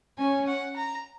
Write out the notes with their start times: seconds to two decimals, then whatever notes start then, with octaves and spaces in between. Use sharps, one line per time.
0.18 C#4 G#5
0.47 F#5
0.76 A#5